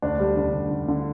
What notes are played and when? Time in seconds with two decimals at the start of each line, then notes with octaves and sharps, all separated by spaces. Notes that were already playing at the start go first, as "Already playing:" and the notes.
0.02 D2 D4
0.20 G3
0.37 D2
0.54 D2
0.70 D2
0.88 D3